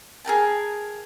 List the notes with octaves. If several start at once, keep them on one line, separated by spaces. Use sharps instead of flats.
G#4 A#4 G5 A5